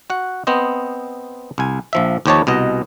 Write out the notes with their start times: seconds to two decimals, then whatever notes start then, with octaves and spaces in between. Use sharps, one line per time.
0.10 F#4 F#5
0.47 B3 C4 C5 D#5
1.58 C2 G#5
1.93 A#1 F3 E5
2.26 D#2 F3 G4 C#5 D#5 A5
2.47 C2 B2 D#5